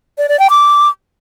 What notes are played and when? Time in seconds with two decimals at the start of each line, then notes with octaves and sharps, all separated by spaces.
0.18 D5
0.29 D5
0.39 G5
0.50 D6